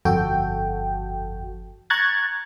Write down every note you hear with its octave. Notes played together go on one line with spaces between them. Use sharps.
G1 F2 F#4 A4 G5
A#5 C#6 F#6 G#6 A6